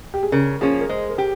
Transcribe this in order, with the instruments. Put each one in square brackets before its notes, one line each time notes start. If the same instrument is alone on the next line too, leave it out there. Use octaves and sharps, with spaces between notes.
[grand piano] G4
G#4
[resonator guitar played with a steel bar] C#3 [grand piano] A#4
[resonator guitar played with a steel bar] F3 A#3 C#4 [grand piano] G#4
[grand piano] A#4
[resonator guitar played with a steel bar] G#3 [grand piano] C5
[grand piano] A#4
[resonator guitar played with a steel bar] G4